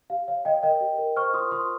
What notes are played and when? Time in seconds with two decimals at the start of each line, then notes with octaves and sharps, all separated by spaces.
0.10 G4 F5
0.28 C#5 F5
0.45 C#5 D#5 G5
0.63 A#4 D#5 G5
0.81 G4
0.98 A#4
1.16 C5 C#6 F6
1.34 F4 C6 D#6
1.51 F4 C6 D#6